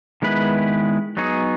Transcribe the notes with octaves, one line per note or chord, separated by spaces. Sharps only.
D#3 G#3 B3 E4 B4
F#3 B3 D#4 G#4 C#5